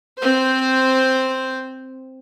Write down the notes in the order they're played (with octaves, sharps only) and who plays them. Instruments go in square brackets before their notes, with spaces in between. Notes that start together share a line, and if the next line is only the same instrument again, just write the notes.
[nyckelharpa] C4 C5